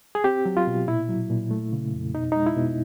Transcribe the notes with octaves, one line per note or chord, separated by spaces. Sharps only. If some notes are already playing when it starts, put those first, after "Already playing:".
G#4
C4 G4
F#3
F4
B2
A#2 E4
F#3
A#2
A3
C#3
F2
B2 D#4
G#3 D#4
E4
B2